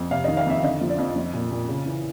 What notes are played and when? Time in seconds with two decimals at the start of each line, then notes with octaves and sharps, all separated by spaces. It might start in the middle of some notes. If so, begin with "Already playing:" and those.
Already playing: F2
0.10 C3 F5
0.24 D#3 D#5
0.37 F5
0.46 F2 E5
0.63 D3 D#5
0.81 F3
0.89 D5
0.99 F2
1.16 F3
1.34 A#2
1.51 A#2
1.68 C#3
1.86 E3